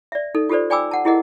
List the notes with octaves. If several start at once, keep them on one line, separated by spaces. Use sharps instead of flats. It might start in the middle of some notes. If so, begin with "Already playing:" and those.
D5 E5
D#4 A4
F4 G4 A4 C5 D5
D5 G5 G#5 B5 D6 E6
F#5 A5
E4 G4 G#4 A#4 D#5 F#5